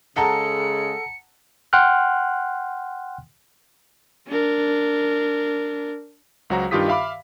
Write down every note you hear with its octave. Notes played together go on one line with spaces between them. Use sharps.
C#3 G#3 A4 F#5 A5 A#5 C#7
F#5 G5 C6 F6 F#6
D4 A#4
C#2 F#3 F#4 C5 A#5
G2 D#3 F4 G4 D#6 B6
E5 F5 B5 D6